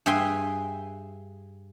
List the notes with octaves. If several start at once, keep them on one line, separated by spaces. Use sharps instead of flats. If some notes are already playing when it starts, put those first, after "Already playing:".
G2 G#4 E5 G5 G#5 C6